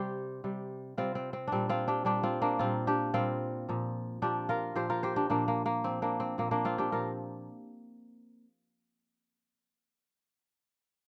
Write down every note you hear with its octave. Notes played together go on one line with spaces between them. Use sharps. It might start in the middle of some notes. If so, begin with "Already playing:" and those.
Already playing: C3 G3 G4 C5
C3 G3
C3 G3 C4 F4
C4
C4
A#2 G3 C4 D4
C4 F4
D4 G4
A#2 G3 D4 G4
C4 F4
A#3 D4
A#2 G3 C4 F4
D4 G4
A#2 G3 C4 F4
A#2 F3
A#2 F3 D4 G4
F4 A#4
A#2 F3 G4 C5
F4 A#4
G4 C5
D4 G4
A#2 F3 A#3 D4
A#3
A#3
A#2 F3 C4
A#3 D4
C4
A#2 F3 A#3
A#3 D4
C4 F4
D4 G4
A#2 F3 F4 A#4